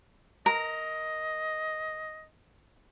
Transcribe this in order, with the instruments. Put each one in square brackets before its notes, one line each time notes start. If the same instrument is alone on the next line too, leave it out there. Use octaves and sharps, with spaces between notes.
[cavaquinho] A#4 [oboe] D#5